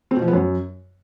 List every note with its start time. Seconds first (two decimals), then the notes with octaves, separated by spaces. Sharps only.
0.11 C4
0.17 B2
0.22 F3
0.28 B3
0.33 F#2